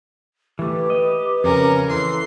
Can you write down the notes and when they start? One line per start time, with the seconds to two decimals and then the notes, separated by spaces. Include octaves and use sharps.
0.59 E3 A3 G4 B4
0.90 D#5
1.44 F2 C#3 C#4 A#4
1.90 E3 A4 C6